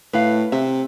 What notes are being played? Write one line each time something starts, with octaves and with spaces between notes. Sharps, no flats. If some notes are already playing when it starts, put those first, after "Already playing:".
A2 B4 F5
C3 E5